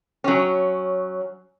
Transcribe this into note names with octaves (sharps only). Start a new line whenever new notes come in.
F#3 C#4